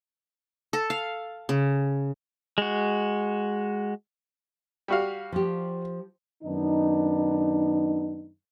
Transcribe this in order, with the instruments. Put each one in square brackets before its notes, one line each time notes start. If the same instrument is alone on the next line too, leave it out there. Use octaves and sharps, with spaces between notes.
[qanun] A4
F5
C#3
[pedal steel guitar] G#3 F#4
[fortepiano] G3 F#4 F5
[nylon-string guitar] F3 G4
[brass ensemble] F#2 D#3 B3 D4 D#4